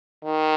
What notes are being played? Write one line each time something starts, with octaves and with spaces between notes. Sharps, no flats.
D#3